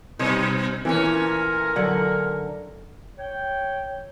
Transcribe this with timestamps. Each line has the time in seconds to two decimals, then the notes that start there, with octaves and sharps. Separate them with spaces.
0.19 B2 G3 D#4 C5 C#5 D#5
0.85 A#2 E3 A3 C#4 A#4
1.76 D3 F#3 F#5
3.18 C#5 G5